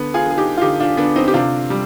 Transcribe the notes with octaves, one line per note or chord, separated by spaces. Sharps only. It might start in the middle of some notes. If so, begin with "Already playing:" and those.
Already playing: D3 B3
F4 G#4
D3
G#4
D#4 G4
F4
D3 D#4 G4
D4 F4
D3 B3 D4
C4 D#4
G4
C3 D4 F4
G3